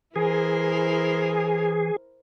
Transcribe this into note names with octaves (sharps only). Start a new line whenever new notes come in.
E3 E4 G#4 A#4 C5